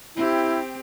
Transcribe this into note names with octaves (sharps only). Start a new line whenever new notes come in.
C4 E4 G4